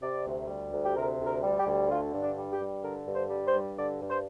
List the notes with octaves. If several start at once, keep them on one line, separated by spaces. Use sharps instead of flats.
C3 D5
D2
G3
D2
G4
C3 A#4
D2
A#4
G3
G4
D2
D3 F4
G2
D4
G3
G4
G2
D3 A#4
G2
C5
G3
C5
G2
D3 D5
G2
C5